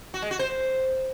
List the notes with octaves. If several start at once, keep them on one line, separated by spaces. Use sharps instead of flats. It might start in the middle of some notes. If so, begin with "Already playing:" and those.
F#4
G#3
F#4
C5